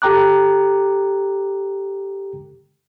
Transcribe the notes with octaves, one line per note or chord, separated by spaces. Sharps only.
G4 A4 G5 A#5 D6 F#6